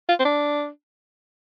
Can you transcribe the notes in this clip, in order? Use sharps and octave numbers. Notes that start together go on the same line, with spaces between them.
F4
C4
D4